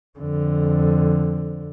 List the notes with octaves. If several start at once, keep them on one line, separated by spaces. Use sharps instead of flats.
F2 D3